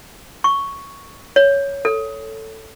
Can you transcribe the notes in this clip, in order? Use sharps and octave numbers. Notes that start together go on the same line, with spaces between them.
C#6
C#5
A4